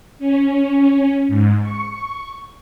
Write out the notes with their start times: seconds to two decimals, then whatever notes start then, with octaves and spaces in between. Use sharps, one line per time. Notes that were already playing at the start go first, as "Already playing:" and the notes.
0.19 C#4
1.28 G#2
1.62 C#6